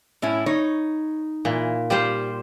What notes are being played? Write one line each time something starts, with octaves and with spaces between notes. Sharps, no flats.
A2 C#4 E4
D#4 C#5
A#2 E3
G3 F4 G4 C5